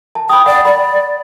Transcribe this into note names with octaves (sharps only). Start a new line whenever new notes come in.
A5
G5 B5 D#6
D5 F#5
D5 B5